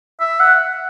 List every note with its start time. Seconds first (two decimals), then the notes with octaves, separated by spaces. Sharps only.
0.21 E5
0.40 F#5